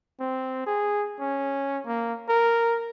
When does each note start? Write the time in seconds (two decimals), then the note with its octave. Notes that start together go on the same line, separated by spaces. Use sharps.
0.20 C4
0.66 G#4
1.19 C#4
1.86 A#3
2.29 A#4